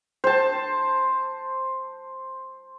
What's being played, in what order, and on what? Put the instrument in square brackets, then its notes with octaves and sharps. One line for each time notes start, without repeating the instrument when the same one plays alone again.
[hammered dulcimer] C5 A5